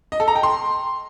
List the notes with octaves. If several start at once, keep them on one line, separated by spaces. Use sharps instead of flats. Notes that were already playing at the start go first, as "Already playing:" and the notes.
D#5
A4
A#5
G5
C6